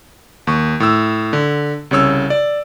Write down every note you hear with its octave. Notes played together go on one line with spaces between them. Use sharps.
D#2 C#6
A2 E6
D3
C2 C#3 C#5 E6
D5